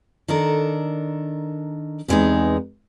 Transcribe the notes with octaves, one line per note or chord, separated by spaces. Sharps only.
D#3 D4 A4 A#4
E2 C3 G#3 A#3 B3 D#4